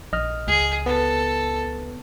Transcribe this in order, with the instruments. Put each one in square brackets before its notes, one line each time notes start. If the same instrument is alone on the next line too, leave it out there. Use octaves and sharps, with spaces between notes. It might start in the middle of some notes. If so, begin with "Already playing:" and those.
[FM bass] A#1 [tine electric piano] D#5 F6
[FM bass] C#2 [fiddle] G#4
[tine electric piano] B3 [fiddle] A4